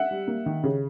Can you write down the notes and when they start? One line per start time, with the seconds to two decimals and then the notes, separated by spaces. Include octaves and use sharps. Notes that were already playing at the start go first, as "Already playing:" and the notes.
Already playing: E5 F#5
0.11 G3
0.27 A#3
0.46 D#3
0.63 C#3